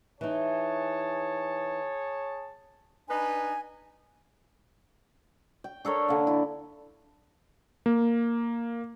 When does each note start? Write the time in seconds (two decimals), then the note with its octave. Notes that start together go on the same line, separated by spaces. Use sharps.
0.21 E3 D#4 G#4 C#5 A5
3.09 D4 D#4 B4 G#5
5.64 G5
5.85 D4 A4 A#4 C#5
6.08 D3 A#3
6.27 E4
7.86 A#3